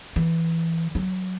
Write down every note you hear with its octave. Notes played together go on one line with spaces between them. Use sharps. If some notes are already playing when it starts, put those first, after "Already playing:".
E3
F#3